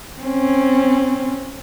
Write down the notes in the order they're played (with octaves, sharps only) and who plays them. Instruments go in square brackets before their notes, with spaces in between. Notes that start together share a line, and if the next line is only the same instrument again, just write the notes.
[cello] C4 C#4